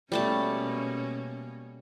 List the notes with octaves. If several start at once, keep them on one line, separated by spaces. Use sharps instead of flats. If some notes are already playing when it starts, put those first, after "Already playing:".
B2 G3 A3 A#3 C#4 A5